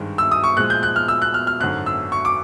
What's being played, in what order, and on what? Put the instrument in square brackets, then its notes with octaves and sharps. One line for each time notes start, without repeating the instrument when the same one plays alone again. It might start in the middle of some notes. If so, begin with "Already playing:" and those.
Already playing: [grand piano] G#1 G2 D#3 G#3
E6
D#6
C#6
A#2 F3 G#3 F#6
G6
F#6
F6
E6
F#6
F6
F6
G#1 F#2 D3 F#6
E6
C#6
D6